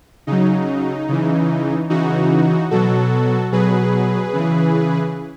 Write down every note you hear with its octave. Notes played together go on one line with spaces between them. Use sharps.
C#3 F#3 D#4
C#3 E3
C#3 E3 D#4 F#4
B2 F#3 F#4 A4
B2 F#3 G#4 B4
C#3 E3